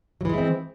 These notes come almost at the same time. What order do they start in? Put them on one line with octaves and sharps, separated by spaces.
F#3 E3 G#3 E4 C4